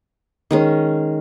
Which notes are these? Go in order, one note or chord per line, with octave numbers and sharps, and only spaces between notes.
D#3 G#3 C#4